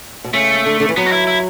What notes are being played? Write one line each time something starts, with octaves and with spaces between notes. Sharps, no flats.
B2
C#3 A3
D3
D3
E3
F#3 B3
F#4
E4
E4